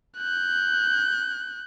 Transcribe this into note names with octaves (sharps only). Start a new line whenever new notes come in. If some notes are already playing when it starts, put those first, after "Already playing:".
F#6 G6